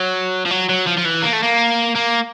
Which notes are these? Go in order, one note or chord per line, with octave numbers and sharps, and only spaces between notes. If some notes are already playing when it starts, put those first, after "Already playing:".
Already playing: F#3
F3
F#3
F#3
F3
F3
E3
A#3
A3
A#3
A#3